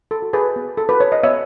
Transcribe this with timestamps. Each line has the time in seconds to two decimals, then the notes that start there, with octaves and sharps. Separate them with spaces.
0.11 A4
0.22 F#4
0.33 G#4 B4
0.56 B3
0.77 A4
0.89 F#4 B4
1.00 C#5
1.12 D#5
1.23 B3 C#5 E5